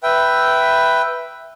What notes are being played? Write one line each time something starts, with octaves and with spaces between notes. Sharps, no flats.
B4 E5 G5